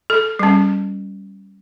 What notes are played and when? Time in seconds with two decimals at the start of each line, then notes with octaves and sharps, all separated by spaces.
0.10 A4
0.39 G3 C#4